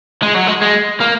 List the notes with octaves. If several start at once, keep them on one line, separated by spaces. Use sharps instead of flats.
G#3
F#3
G#3
G#3
A#3